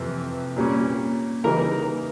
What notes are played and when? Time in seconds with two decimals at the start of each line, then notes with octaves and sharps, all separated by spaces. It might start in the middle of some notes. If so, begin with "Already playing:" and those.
Already playing: F2 C3 E3
0.56 A#2 G3 A#3 C#4
1.44 C#3 E3 G3 A#3 D#4 A#4 A#5